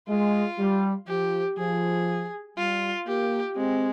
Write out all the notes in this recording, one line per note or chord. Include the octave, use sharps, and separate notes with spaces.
G#3 F4
G3
F3 G4
F3 G#4
G3 F4
A#3 G4
G#3 C4